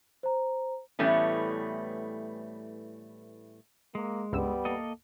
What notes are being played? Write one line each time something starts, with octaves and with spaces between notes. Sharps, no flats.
C5 A#5
A2 E3 G3 A3 B3 C#4
G#3 A#3
C#2 G2 G3 B3 E6
A#3 A4 D#5